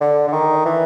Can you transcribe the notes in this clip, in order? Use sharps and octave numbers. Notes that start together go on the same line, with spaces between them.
D3
D3
D#3
E3